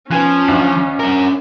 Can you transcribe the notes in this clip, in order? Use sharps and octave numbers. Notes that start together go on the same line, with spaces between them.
F3 B3 C#4 G#5 F#6
D2
C#4 A#4